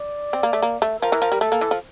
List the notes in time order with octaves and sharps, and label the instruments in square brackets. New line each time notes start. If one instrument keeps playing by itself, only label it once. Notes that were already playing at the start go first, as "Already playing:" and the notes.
Already playing: [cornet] D5
[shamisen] C4
A#3
A3
A#3
A3
[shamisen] F3 [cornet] A#4
[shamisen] E3
F3
G3
[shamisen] A3 [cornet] A4
[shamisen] A#3
E3
F3